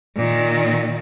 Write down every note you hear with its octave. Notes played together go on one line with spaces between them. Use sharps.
A#2 D#3